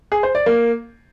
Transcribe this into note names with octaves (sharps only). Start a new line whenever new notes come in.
G#4
C5
D5
A#3